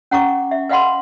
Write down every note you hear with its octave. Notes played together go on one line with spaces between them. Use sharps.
C#4 F#5 A#5 C#6 D6
E5
B4 D#5 F5 F#5 B5 C6